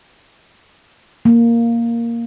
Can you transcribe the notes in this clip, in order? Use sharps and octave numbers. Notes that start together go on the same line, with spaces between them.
A#3